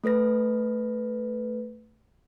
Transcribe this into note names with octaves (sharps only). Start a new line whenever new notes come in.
A3 A4 B4 A#6